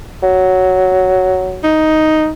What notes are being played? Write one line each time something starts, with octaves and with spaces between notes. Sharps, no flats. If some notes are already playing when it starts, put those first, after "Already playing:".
F#3
D#4